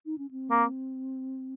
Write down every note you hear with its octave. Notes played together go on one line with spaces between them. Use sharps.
D#4
C#4
C4
A#3